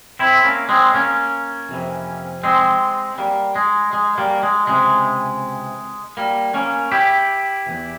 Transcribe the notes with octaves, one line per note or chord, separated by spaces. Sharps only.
C4 E4
A#3 C#4
G#3 C4
A#3 C#4
F2 C3 E3
G#3 C4
G3 A#3
G#3
G#3
G3 A#3
G#3
C#2 C3 E3 G#3
G3 A#3
A#3 C#4
E4 G4
E2 E3